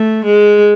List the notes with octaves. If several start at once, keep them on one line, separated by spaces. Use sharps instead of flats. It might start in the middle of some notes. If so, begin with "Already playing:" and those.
Already playing: A3
G#3